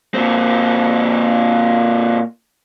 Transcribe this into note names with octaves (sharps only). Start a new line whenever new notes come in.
A#2 C4